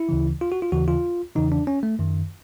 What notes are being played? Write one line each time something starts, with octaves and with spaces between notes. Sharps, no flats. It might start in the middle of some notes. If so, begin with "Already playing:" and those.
Already playing: E4
D2 C#3 E3
F4
F#4
F4
D#2 C#3 E3 F#4
F4
E2 C#3 E3 D#4
D4
C#4
A3
F#2 D#3